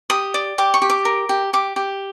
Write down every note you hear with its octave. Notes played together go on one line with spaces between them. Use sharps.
G4 D#6
D5
G4 D6
C#6
G4
D6
A#4
G4
G4 D6
G4